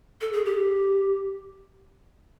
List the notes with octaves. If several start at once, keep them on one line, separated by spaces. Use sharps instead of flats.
A4
G#4
G4